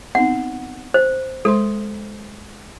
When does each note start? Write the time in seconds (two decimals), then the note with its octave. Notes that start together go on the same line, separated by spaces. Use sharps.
0.15 B3 C4 D#4 F#5
0.94 C5
1.45 G#3 A4 C5 C6